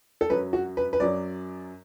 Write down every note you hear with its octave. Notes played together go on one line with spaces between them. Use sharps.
A4
F#2 F#3 B4
F#4
B4
B4
F#2 F#3 D5